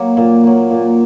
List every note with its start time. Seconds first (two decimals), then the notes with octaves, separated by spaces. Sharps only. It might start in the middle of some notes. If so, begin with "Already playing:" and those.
Already playing: F#3 A#3
0.17 A#2
0.44 F#3 A#3
0.71 A#2